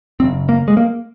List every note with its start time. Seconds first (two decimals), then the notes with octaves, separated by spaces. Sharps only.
0.20 F#1 F#2 C#3 C4
0.49 A#3
0.68 G#3
0.77 A#3